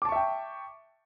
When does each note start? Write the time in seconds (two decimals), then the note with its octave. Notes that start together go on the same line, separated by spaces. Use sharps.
0.02 D6
0.05 A5
0.09 C#6
0.12 E5
0.16 G5